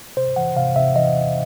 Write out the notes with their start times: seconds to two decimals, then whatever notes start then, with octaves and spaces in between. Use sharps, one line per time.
0.17 C3 C5
0.36 E3 F#5
0.56 C3 F5
0.76 C3 E5
0.96 E3 D#5